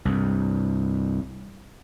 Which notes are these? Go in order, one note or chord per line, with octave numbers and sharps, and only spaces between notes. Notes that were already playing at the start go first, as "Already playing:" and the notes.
C2 G2